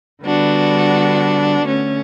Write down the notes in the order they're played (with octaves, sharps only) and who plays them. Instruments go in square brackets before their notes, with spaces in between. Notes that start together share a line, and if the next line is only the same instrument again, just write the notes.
[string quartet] D3 G3 B3 D4 F#4
D3 A3 C#4